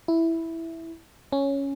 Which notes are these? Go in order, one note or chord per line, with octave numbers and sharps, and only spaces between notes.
E4
C#4